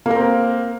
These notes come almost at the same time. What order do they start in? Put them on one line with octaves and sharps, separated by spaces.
A#3 A#4 C4